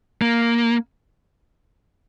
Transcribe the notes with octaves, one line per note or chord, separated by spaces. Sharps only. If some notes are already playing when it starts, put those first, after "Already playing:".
A#3